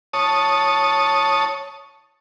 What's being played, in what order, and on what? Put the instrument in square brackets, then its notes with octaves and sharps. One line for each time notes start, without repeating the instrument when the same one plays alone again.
[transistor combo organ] C#5 A5 D#6